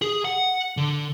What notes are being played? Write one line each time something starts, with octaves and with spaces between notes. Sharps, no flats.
G#4
F#5
D3